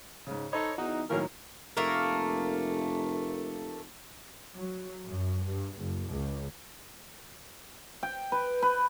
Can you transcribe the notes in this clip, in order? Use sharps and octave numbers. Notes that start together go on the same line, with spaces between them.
G#2 C#3
D#4 A4 C5 C#5 D#5 B5
E2 D#4 F#4
A2 D#3 F#3 A#3 C#4 A#4
F1 A3 A#3 A#4
F#3
F#2
G2
F#1
C#2
G5
B4
B4